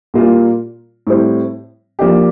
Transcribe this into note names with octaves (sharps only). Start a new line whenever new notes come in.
A#2 G3 A#3 F4
A2 G3 C4
F3 A#3 D4 G4